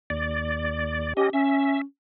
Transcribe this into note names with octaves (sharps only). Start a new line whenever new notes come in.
D#2 D5
C#4 G4 D#5
C#4 E5